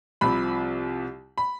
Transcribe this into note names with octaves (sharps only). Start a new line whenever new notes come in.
C2 C3 F3 B5
B5